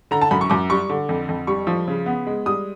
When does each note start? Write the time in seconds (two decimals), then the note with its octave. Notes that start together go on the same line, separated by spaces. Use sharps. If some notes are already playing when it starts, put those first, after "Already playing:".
0.11 D3 A#5
0.21 A5
0.31 F#2 B5
0.41 C#6
0.50 F#2 D6
0.70 G3 C#6
0.89 D3
1.09 F2
1.29 F2
1.47 G3 C#6
1.67 F3
1.88 C#3
2.06 B3
2.27 G#3
2.46 G3 D#6